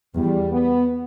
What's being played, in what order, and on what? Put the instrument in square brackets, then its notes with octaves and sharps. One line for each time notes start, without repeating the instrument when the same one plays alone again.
[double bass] E2 [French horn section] G3
[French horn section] B3